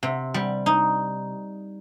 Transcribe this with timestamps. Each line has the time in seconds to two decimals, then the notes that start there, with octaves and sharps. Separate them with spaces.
0.03 C3
0.34 G3
0.66 D#4